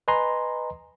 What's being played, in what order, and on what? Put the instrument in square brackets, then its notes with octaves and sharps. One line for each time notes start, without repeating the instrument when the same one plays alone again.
[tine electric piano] B4 D#5 G#5 A#5 C6